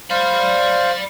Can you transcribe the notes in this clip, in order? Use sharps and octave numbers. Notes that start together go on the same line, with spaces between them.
C5 D5 F5 B5